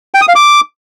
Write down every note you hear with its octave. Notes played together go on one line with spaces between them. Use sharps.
G5
D#6
F5
D6